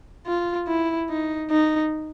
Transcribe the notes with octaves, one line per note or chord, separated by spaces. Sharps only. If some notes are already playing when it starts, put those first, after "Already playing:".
F4
E4
D#4
D#4